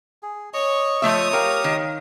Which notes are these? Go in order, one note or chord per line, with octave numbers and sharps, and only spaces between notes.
G#4
C#5 D#5 C#6
F3 A3 C#5 E5 D#6
G4 A#4 F5 A#5
D#3